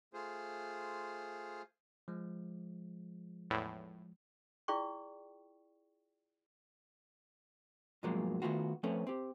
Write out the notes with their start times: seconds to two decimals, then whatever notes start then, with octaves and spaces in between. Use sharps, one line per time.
0.14 A3 F4 G#4 C5
2.08 F3 G#3
3.50 E2 A2
4.68 E4 F4 G#4 D5 G5 C#6
8.03 G2 B2 F3 F#3 G#3 A#3
8.42 D#3 E3 A3 B3 F4 F#4
8.83 F3 A3 C4 C#4 A4 B4
9.07 C4 G4